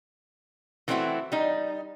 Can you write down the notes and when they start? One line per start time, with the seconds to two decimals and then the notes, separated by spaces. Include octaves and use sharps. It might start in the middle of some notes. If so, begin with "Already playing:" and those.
0.88 E3 A3 C4 C#4 E4 F#4
1.32 G3 D#4